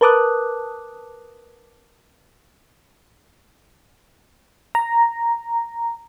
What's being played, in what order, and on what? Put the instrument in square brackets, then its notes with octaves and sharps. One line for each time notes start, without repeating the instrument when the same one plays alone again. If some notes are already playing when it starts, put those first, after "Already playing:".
[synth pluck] A#4 B4 A5 D6 D#6 F#6
[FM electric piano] A#5